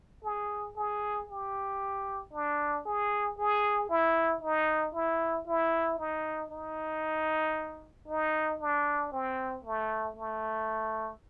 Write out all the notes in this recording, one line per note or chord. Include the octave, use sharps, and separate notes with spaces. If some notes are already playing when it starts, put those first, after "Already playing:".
G#4
G#4
G4
D4
G#4
G#4
E4
D#4
E4
E4
D#4
D#4
D#4
D4
C4
A3
A3